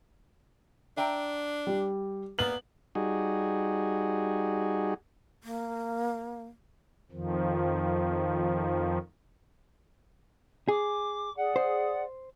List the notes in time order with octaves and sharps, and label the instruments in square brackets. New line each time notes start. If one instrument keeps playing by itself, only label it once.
[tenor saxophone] D4 [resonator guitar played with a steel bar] E5 G5 A#5
[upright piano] G3
[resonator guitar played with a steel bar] A#3 G#4 D5 [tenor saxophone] B3 [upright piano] F#7
[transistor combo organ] G3 D#4 F#4 G#4
[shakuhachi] A#3
[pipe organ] F2 D#3 F3
[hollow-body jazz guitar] G#4 [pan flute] D6
[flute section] G#4 D5 [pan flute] F#5
[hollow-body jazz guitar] C5